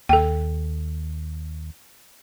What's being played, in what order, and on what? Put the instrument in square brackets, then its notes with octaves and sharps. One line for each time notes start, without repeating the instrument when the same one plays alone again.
[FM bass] D#2 [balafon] A4 G5